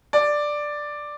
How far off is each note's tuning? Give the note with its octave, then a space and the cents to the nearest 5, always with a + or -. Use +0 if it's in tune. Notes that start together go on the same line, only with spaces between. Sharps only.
D5 +5